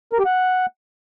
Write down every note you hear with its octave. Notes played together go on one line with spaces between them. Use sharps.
A#4
G4
F#5